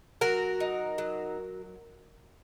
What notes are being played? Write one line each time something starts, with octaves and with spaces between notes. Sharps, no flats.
F#3 F#4 A#4
D#4
F#3